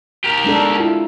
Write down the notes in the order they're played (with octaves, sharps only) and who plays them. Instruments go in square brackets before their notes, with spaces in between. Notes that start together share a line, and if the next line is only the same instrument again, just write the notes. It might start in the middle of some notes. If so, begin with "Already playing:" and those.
[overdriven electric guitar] G4 A#4
[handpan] G#3 D4 A4
E4 F4